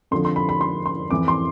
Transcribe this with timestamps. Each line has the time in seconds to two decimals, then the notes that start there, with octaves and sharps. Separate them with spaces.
0.11 F2 D3 F3 C6
0.25 C6
0.36 B5
0.49 B5
0.61 C6
0.86 C6
1.11 F2 E3 D6
1.28 C6